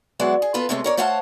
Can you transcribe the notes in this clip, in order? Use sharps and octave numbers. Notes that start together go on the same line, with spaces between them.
F#3 G#3 B3 D5 E5 F#5
G#4
B3 F4 A4 B4
C3 G#3 A3 C4 C#4
A#4 C#5 D5
A3 C5 C#5 F5 F#5 A5